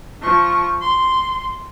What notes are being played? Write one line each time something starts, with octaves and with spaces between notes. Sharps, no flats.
F3 C#6
C6